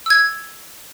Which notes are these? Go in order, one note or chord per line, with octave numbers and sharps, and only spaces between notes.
E6 G#6